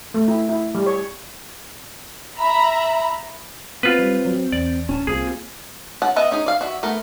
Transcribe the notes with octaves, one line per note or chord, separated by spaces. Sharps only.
A3
E4
E4
G3
C#5
E5 A#5 B5
B3 C4 F4 B4
G3
F#3
E2 D5
D1 C#4 G#5 A5
C2 A#3 C4 F4 G#4
C#4 F#5 A5
B3 D#5 E5 F#5
C#4 D#4 G#4
D5 F5
F#4 D5 E5
A3 B3 A#4